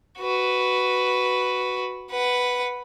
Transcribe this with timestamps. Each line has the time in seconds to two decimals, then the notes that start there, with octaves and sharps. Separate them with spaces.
0.18 F#4 B4
2.10 B4 F#5